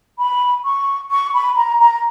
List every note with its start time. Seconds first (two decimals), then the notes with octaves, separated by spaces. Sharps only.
0.18 B5
0.64 C#6
1.10 C#6
1.34 B5
1.56 A#5
1.79 A#5